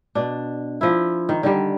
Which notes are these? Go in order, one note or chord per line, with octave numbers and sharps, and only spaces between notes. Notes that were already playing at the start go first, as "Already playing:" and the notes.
B2 D4
F3 E4
D#3
D3 D#3 G3